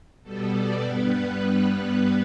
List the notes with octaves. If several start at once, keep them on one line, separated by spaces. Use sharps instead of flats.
B2 G3 B3 A4
D5
G2 G3 B3 B4